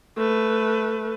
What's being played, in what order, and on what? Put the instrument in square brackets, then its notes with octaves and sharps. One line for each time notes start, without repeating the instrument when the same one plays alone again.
[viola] A3 B4